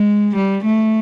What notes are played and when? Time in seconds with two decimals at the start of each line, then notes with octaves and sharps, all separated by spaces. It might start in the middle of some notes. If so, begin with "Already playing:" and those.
Already playing: G#3
0.35 G3
0.64 A3